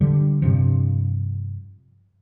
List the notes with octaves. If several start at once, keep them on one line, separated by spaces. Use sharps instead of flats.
D3 G3
G2 C3 F3